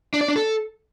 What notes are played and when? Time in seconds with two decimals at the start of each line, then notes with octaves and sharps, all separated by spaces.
0.14 D4
0.21 D5
0.28 D4
0.36 A4